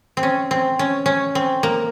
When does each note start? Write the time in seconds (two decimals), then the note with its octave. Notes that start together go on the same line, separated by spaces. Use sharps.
0.17 C4
0.23 C#4
0.51 C4
0.79 C#4
1.06 C#4
1.35 C4
1.63 A#3